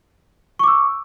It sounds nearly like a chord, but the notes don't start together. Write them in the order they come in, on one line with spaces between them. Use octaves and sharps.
C#6 D6 E6